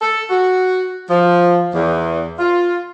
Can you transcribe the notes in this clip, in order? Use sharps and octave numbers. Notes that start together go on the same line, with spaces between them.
A4
F#4
F3
E2
F4